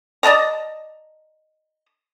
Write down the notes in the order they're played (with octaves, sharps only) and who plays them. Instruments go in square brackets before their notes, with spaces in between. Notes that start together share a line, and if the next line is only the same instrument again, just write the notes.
[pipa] D5 D#5 A5 A#5